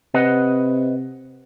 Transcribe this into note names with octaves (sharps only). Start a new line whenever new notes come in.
C3 B4 D#5 F#5